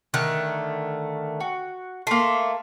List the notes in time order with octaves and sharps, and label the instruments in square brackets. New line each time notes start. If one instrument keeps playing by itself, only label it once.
[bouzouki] D3 D#3 A3 [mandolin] F#6
[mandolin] F#4
[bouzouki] A3 [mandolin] A#3 C6